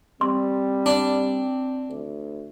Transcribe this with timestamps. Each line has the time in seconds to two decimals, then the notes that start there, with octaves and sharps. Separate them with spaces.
0.21 G3 C4 C6
0.86 D4
1.89 D2